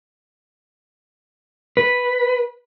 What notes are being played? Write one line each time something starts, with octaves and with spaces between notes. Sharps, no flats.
B4